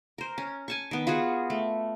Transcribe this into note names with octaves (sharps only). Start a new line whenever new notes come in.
A#4 C5
C#4
G#5 A5 C#6
D#3 B3
F4 F#4 G#4 F#5
A3